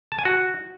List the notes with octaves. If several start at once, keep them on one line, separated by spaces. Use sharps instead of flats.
A5
G#5
F#4